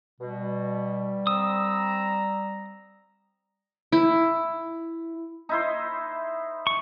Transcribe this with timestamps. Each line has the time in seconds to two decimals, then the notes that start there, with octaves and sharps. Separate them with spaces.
0.20 B2 G3
1.27 D3 C4 A#5 D#6 E6
3.92 E4
5.49 D#4 E4 C5
6.67 C#6